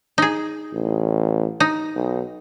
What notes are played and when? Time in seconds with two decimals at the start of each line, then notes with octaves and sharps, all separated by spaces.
0.18 D#4 G#4
0.74 A1
1.60 D#4
1.95 B1